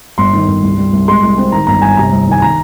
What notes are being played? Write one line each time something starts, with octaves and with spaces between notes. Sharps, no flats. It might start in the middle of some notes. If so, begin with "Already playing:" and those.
G1 C6
D#3
G1
C2
G3
C2
G#3 C6
C2
C4
D#3 A#5
G1 A#5
G1 G#5
C3 A#5
C2
D#3 G#5
D#3 A#5